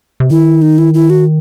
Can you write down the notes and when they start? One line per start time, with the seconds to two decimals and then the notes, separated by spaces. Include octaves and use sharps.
0.20 C3
0.30 D#3 E4
0.62 D#4
0.78 E4
0.94 E4
1.10 F#4